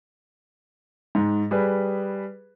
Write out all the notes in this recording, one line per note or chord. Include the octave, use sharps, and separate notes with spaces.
G#2
G3 G#4 B4